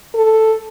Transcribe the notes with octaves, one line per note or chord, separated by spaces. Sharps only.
A4